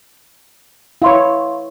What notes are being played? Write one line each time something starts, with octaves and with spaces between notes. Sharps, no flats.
E4 C#5 F5 C6